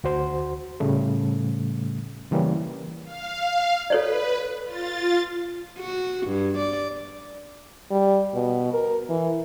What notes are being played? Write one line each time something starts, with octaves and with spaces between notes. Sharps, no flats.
D2 F#4 C5
A2 C#3 G3 A3
C#3 E3 G3 A#3 C#4
F5
A4 B4 C#5 D5
F4 A6
F#4
G2
D5
G3
B2
A#4
E3